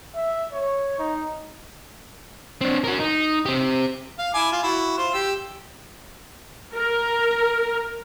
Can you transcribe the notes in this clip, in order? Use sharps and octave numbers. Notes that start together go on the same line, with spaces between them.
E5
C#5
D#4
C4 D4
F#4 A#4
D#4
C4 G4
F5
E4 G#5 D6
F4
E4 F#4
F4 C5
G4 E6
A#4